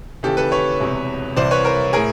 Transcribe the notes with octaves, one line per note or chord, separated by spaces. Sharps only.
D#2 C#3 E3 G4 A4
A4 B4
B4 C#5
E1 E2 C3
C2 C3 E3 C5 D5
B4 C#5
A#4 C5
A2 G#4 A#4